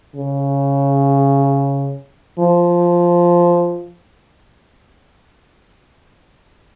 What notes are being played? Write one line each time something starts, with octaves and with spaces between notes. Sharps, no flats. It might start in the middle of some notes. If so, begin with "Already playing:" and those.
C#3
F3